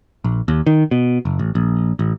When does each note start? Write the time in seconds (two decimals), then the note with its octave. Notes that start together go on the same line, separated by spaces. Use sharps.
0.24 A#1
0.48 D#2
0.67 D#3
0.91 B2
1.25 F#1
1.39 A1
1.55 A#1
1.99 A1